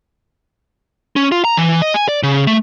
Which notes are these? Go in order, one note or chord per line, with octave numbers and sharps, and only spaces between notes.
C#4
F4
A#5
E3
D#5
G#5
D5
C#3
A3